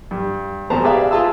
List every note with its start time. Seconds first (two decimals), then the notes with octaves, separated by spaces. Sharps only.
0.11 G2
0.70 A1 D2 B3 C5 A5 A#5
0.84 G4 G#4 B4 D5 E5 F5
1.11 F4 G#4 A5 D#6 E6